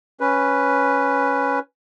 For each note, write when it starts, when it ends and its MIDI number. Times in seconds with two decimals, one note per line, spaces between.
0.20 1.59 61
0.20 1.59 71